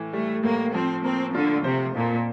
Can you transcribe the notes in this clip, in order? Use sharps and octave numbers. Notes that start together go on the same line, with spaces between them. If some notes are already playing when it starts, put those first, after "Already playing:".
Already playing: A2 E3
G3 A3
A2 A#3
F3 C4
A#3 C4
D3 F4
C3 C5
F2 A#2